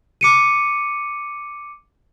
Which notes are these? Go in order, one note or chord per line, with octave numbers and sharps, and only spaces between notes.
D6 C#7 D#7